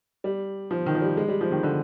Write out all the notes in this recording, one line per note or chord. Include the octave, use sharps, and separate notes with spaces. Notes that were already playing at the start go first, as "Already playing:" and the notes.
G3
F3
D#3
F3
G3
G#3
G3
F3
D#3
D3